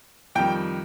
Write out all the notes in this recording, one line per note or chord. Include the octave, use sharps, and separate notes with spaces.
F2 D#3 G3 G5